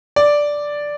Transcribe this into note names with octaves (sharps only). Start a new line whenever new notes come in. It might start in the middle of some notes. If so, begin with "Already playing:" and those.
D5